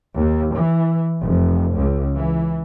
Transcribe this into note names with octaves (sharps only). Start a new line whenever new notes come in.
D#2
E3
F1
C#2
E3